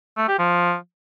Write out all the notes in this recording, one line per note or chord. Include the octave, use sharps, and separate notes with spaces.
A3
G4
F3